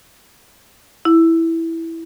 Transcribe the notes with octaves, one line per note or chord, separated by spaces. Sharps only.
E4